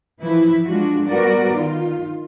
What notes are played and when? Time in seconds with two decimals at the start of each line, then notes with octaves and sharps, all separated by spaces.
0.20 E3 F3 E4 B4
0.67 G#3 D4 F4 F#4
1.06 G3 B3 F#4 A#4 D5
1.50 D#3 F4